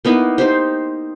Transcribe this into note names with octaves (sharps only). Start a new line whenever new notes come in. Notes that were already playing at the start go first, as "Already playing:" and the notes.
A#3 B3 D#4 E4
D#4 G4 C5